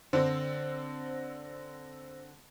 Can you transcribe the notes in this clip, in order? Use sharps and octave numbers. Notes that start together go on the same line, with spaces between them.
D3 C4 C5 E6 A#6